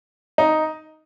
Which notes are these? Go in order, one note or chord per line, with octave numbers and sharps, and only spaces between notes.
D#4